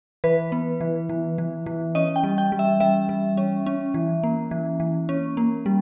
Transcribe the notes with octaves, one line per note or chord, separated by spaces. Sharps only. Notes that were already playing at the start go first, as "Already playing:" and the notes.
E3 B4
B3
E3
E3
E3
E3
C#4 D#5
G5
G3
G5
G3
E5
G3 E5
G3
C#4
C#4
E3
A#3
E3
E3
C#4
A#3
G3